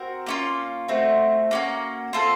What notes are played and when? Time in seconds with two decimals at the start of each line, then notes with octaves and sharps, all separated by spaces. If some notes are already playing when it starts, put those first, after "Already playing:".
Already playing: C4 F#4 A#4
0.26 A#3 C#4 F4
0.88 A3 C4 F#4
1.51 A#3 C#4 F#4
2.13 C4 F4 A4